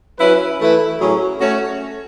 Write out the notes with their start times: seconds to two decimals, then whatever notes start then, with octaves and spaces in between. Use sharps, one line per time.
0.18 F#3 C#4 E4 B4
0.59 E3 A3 E4 B4
0.99 A2 F#3 C#4 G#4
1.40 A3 C#4 F#4 C#5